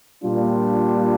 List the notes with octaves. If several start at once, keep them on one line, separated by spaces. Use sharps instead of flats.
A#2 G3 D4 F4